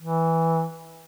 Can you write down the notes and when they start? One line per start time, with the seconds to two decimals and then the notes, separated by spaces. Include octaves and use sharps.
0.02 E3